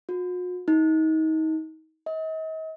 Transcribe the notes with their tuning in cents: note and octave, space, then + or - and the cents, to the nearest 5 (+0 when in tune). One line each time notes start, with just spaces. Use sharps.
F#4 -45
D#4 +30
D#5 +40